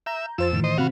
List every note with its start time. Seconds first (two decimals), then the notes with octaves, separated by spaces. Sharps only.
0.06 E5 A#5 G6
0.38 F2 F4 C5 E6 A6
0.53 A2 D#3 E3
0.64 C5 D#5
0.78 C3 C4 F#4 F5 B5